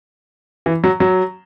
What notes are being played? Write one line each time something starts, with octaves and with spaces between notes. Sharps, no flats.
E3
F#3
F#3